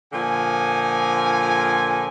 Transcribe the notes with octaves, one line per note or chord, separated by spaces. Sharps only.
A#2 D3 F3 G#5